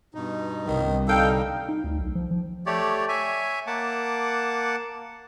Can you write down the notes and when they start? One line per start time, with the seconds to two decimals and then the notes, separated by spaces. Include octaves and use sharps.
0.14 G2 B2 D#4
0.67 C2 D#3
1.08 D3 G3 D#4 A4 F5 G5
1.69 D#4
1.84 D2
1.99 B1
2.15 F3
2.31 F3
2.66 A3 G4 C#5 D5
3.08 C#5 E5 G#5
3.67 A#3 F#5 A5 D6